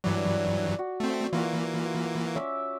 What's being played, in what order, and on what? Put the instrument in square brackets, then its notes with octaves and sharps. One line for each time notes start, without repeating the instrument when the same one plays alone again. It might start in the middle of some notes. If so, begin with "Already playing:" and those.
[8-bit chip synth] G2 E3 F#3 [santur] D5
[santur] F#4
[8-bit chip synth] A3 C4
[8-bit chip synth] E3 A#3 [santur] F4 F#4
[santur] C#4 E5 D6